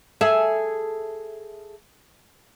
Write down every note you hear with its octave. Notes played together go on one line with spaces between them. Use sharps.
G#4 A4 E5